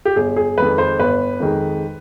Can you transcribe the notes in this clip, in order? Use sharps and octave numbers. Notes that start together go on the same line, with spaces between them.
G4
G1 G#4
G#4
F2 D#3 G#3 B4
C5
G1 B4
F2 D#3 G#3